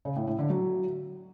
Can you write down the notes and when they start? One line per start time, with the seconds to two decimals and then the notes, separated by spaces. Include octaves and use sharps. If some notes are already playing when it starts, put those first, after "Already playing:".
0.05 C#3
0.16 A2
0.27 A2
0.39 D3
0.50 F#3